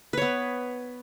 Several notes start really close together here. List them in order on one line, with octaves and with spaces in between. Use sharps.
B4 C#5 B3